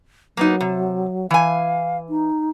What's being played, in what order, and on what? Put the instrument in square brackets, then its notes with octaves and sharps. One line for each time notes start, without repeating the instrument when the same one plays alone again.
[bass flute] F#3 [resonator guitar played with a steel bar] A#3 B3 D#4
[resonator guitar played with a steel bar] C3
[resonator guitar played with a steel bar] E3 G#5 [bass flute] F5
[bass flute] D#4